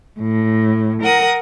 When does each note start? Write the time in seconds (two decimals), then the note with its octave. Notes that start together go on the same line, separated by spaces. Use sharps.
0.18 A2
1.02 A#4 F#5 D#6